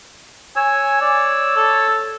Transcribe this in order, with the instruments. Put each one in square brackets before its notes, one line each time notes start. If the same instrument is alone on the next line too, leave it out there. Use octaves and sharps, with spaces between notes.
[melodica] C#5 E6 [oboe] G#5
[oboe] D5
A4